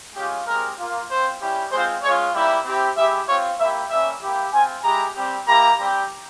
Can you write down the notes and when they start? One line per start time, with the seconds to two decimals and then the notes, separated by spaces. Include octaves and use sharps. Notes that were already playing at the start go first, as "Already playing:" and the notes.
0.15 G#3 C#4 F4 G4
0.46 G#3 C4 G4 A#4
0.78 A#3 F4
1.09 C4 F4 C5
1.40 G3 C#4 E4 G4
1.72 G#3 C4 F4 C5
2.03 G#3 C#4 F4 C#5
2.33 G3 A#3 E4 G4 E5
2.65 C4 E4 G4
2.96 G#3 E4 G4 E5
3.28 C4 F4 C#5
3.59 A#3 E4 G4 E5
3.89 G3 A#3 C#4 E5
4.22 A#3 E4 G4
4.52 C4 F4 G#5
4.83 G#3 E4 G4 A#5
5.14 G3 C4 G4
5.46 A#3 E4 G4 A#5
5.78 G3 C4 G4